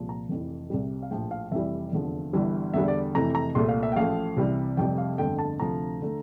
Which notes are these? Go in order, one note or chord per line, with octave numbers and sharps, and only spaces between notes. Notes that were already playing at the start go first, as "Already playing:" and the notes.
Already playing: C2 A#2 F3
A#5
F1 F2 E3
C2 C3 G3
F5
A#1 A2 F3 G5
F5
F1 F2 E3 G3 E5
F1 E2 D3 F3
G1 G2 E3 G3
E2 D3 G3 E5
D5
F2 C3 E3 A3 A#5
A#5
C2 A#2 A3 C6
F5
E5
G5
A1 A2 F3 A3 F5
C2 C3 E3 G3
F1 F2 C3 G3 G5
F5
G1 F2 D3 A3 G5
A5
D2 C3 F3 A3 A#5
D3 A3